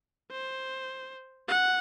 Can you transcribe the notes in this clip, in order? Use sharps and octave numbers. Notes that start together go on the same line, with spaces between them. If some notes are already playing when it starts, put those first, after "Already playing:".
C5
F#5